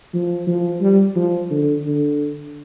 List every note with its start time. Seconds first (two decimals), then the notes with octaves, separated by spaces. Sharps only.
0.13 F3
0.47 F3
0.81 G3
1.16 F3
1.50 D3
1.84 D3